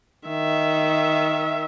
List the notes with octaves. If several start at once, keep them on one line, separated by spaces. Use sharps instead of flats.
D#3 E5